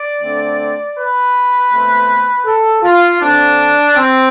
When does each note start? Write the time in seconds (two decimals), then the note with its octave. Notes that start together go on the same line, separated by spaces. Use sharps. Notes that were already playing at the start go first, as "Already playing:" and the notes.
Already playing: D5
0.21 D3 A3 C4
0.96 B4
1.71 B2 A3 C4
2.45 A4
2.83 F4
3.21 D3 A3 C4 D4
3.95 C4